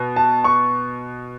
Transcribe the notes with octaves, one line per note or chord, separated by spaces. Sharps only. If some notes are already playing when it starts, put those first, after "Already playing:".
Already playing: B2
A5
C#6